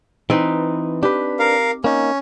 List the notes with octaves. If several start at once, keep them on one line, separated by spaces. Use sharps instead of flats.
E3 C4 D#4 B4
D4 G4 B4
A#4 F5
A#3 C#4 D#4